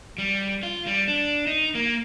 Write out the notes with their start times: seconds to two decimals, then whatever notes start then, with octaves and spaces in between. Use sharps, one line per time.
0.18 G3
0.63 F4
0.86 G3
1.08 D4
1.47 D#4
1.75 A#3